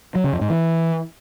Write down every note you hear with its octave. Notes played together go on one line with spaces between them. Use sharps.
F#3
C#3
F2
G#2
E3